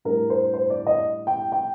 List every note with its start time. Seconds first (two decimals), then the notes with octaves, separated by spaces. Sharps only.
0.05 A2 G3 D4 A#4
0.30 C5
0.54 C5
0.70 D5
0.87 D#5
1.27 G5
1.52 G5